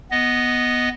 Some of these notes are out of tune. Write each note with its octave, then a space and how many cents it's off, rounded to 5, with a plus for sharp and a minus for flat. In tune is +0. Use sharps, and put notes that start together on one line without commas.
B3 +0 D#5 +0